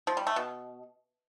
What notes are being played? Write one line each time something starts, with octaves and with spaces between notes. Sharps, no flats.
F3
G3
A3
B2